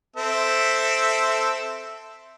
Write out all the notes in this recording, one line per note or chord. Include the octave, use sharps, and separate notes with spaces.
C4 A4 E5